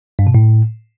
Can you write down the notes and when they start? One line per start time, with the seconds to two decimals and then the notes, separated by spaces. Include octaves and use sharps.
0.19 G2
0.27 B2
0.35 A2